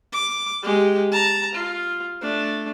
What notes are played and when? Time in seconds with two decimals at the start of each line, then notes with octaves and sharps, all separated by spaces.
0.13 D6
0.63 G#3 G4
1.12 A5 A#5
1.55 F4
2.21 A3 D4